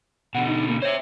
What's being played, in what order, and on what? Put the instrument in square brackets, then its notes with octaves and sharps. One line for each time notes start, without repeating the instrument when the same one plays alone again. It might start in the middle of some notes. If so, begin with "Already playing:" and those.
[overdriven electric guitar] B2 D3 [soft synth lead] F#5
[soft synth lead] D#4
A#3
[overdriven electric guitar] C5 E5 [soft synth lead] C#5